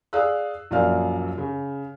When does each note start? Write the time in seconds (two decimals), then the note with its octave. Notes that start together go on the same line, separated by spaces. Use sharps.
0.13 G#4 D5 F5 E6 F#6
0.71 A#1 F#2 F3 D5 F5 F6
1.38 C#3